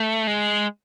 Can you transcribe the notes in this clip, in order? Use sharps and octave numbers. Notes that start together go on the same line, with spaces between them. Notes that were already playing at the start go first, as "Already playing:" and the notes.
Already playing: A3
G#3